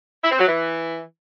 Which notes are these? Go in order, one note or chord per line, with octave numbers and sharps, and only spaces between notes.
E4
C4
F#3
E3